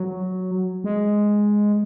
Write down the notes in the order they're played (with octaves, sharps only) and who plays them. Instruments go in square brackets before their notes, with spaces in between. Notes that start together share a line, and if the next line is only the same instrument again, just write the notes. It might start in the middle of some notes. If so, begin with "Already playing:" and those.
Already playing: [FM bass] F#3
G#3